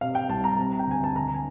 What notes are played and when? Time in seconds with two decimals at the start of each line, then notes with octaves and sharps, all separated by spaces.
0.01 C3 F5
0.15 G5
0.29 C2 A5
0.44 A#5
0.58 C3
0.79 G5
0.87 D2 G#5
1.04 A5
1.15 D3 A#5
1.34 G#5